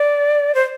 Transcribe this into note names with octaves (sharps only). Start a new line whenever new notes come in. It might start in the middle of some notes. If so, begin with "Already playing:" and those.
Already playing: D5
C5